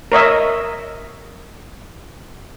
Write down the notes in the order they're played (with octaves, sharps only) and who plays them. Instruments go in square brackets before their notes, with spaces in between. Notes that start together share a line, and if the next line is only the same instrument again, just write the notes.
[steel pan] A#4 C#5 D#5 E5